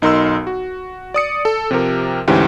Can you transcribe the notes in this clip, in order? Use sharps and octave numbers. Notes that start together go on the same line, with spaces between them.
B1 D#4 A#4 C6 E6
F#4
D5 D#6 C#7
A4
C3 F3 G4 A#4
D2 G#2 E3 C#4 G4